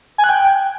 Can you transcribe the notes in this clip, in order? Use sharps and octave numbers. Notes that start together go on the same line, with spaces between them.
G#5
F#6
G5